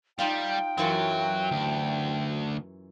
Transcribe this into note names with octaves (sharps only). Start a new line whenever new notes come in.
G3 D#4 F4 F5 G5
F#2 E3 F#3 F4
D2